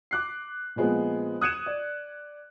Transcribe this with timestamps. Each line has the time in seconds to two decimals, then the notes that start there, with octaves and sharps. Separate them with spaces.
0.11 D6 F#6 C7
0.76 A#2 F3 G#3 B3 C4
1.41 D#6 F#6 G#6 C#7 D#7 E7
1.66 D5